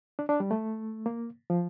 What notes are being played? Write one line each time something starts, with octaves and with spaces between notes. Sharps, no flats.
D4
D4
G3
A3
A#3
F3